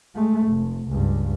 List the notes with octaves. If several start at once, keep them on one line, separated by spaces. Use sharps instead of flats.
G#3 A3
F1
C#2 G2